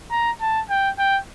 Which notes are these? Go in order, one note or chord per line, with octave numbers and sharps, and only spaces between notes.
A#5
A5
G5
G5